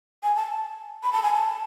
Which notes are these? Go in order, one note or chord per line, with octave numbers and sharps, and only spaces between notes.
G#5
A5
B5
A5
G#5
A5